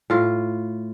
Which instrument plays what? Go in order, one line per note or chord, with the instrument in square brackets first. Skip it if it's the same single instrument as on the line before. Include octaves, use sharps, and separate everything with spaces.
[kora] A2 F4